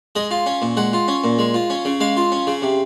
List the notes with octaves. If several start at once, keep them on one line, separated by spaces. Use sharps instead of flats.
G#3 D#5
F4
C#4
A#2
G#3 F#5
F4
C#4
A#2
G#3
F4
C#4
C#3
G#3 F5
F4
C#4
C#3
C3